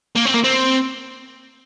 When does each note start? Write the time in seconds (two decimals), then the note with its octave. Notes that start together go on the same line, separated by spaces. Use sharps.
0.16 A#3
0.26 C4
0.34 A#3
0.44 C4